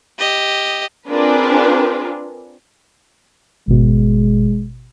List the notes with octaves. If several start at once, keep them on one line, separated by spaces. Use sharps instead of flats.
G4 D#5
C4 D4 F4 G#4 A#4 B4
G#1 B2 G#3